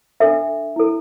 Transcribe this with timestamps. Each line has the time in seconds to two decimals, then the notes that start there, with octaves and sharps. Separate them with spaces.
0.20 D4 A4 E5
0.76 E4 A4